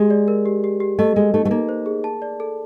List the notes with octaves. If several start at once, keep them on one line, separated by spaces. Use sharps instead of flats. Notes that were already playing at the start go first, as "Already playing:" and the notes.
Already playing: G#3 G4
D5
A#4
G4
G4
G4
A3 D#5
G#3 D#5
A3 D#4
A3
A#3 D#4
C5
G#4
A5
D5
A4